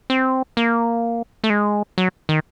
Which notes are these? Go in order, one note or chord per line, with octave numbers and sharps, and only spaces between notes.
C4
A#3
A3
G#3
F#3
D#3